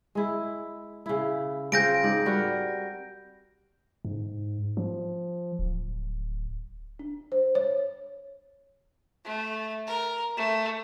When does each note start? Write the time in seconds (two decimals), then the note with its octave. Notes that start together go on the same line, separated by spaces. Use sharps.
0.15 G#3 E4
1.06 C#3 E4
1.72 C#3 C4 F4 G6 A#6 D7
2.03 G#2 D5
2.26 G3 F#4 A#4
4.05 G#2
4.77 F3
5.59 D1
6.99 D4
7.32 C5
7.55 C#5
9.25 A3
9.87 A#4
10.37 A3